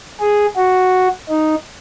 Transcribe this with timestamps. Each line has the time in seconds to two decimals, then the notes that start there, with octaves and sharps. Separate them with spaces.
0.20 G#4
0.56 F#4
1.30 D#4